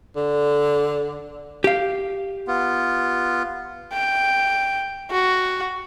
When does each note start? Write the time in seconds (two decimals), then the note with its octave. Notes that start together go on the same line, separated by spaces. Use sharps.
0.16 D3
1.64 G4 F5
2.48 B3 F4
3.93 G5
5.11 F#4